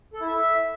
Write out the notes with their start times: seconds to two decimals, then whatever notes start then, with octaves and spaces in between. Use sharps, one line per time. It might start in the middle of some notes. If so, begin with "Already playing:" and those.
0.13 A4
0.20 E4
0.28 E5